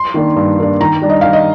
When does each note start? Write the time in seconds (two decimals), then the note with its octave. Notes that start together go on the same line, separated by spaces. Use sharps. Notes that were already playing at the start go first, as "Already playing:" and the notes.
Already playing: C6
0.14 D#3 A#3 D4
0.36 G2
0.59 D#3 A#3 D4
0.81 D#3 A#5
1.02 G3 D4
1.09 D#5
1.21 D#3 F5
1.33 D#5